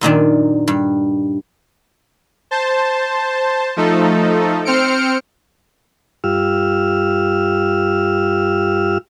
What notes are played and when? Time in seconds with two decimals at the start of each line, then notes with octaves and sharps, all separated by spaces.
0.01 F#2 A#2 D#3 D4
0.68 G2
2.51 C5 A5
3.76 F3 A3 D#4 A4
4.65 C4 C5 F6 C#7 D7
6.24 G2 F4 G4 E6 F6